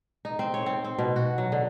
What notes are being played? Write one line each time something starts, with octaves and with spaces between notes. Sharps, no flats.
D#4
C4
C#5
C4
C4
B2
F#4
F#3
D3